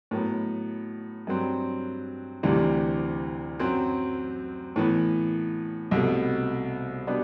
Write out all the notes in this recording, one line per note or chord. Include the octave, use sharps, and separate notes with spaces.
A2 F#3 B3
G2 F#3 C4
D2 C3 E3 G3
F#2 F#3 C4
A2 E3 B3
C2 B2 A3
B2 G3 B3 D4